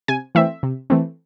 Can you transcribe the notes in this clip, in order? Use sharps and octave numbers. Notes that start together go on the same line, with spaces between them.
C3 G#5
E3 A3 C4 E5
C3
E3 A3 C4